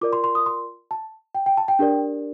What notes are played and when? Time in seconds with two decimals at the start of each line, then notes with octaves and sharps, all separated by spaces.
0.01 F4 A#4 D5 D6
0.13 C6
0.24 C6
0.35 D#6
0.46 C6
0.91 A5
1.35 G5
1.46 G5
1.57 A5
1.68 G5
1.79 D4 G4 A#4 D5